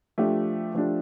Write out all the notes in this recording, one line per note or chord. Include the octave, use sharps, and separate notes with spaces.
F3 A3 D4 G4
F3 A3 D4 G4